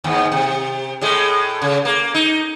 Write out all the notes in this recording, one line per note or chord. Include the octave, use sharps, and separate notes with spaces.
D#2 G#2
C3
A2 G#3 A3
C#3
A#3
D#4